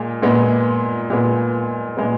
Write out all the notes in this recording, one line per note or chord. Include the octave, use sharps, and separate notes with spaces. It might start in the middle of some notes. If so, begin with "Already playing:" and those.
Already playing: A#2 G#3
A#2 G#3 B3
A#2 G#3 B3
A#2 G#3 B3